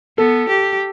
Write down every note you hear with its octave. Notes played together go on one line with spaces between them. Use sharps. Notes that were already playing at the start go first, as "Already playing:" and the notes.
B3 A4
G4